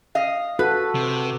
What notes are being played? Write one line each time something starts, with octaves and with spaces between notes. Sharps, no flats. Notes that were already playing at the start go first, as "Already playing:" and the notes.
D#5 F5
F#4 A4 B4
C3